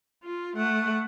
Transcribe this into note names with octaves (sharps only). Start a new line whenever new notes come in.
F4
A3 F#5